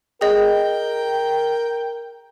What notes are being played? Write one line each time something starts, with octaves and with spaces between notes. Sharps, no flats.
G#4 A#4 D#5 G5